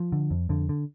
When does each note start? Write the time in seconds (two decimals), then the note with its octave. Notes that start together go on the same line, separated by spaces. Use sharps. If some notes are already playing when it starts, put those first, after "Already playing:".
Already playing: F3
0.12 D3
0.31 F2
0.49 F2 D3
0.69 D3